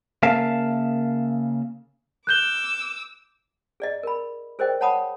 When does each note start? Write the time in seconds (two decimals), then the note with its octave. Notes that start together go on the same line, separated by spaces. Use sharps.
0.23 C#3 A#3 A#4 E5 F5 A5
2.27 D6 E6 F#6 G6 G7
3.80 G#4 D5 D#5
4.03 A#4 B5
4.59 G#4 A#4 C5 D5 D#5 G5
4.81 C#5 F#5 A5 B5 D6 D#6